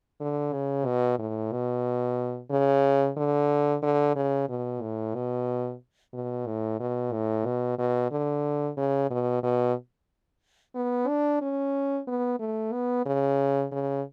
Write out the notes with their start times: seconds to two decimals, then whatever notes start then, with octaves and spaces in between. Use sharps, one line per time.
0.20 D3
0.53 C#3
0.86 B2
1.19 A2
1.52 B2
2.51 C#3
3.17 D3
3.83 D3
4.16 C#3
4.49 B2
4.82 A2
5.15 B2
6.14 B2
6.47 A2
6.80 B2
7.12 A2
7.45 B2
7.79 B2
8.11 D3
8.77 C#3
9.11 B2
9.43 B2
10.75 B3
11.08 D4
11.41 C#4
12.07 B3
12.40 A3
12.73 B3
13.06 C#3
13.72 C#3